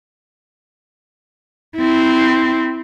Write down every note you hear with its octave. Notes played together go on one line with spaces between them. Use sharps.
C4 E4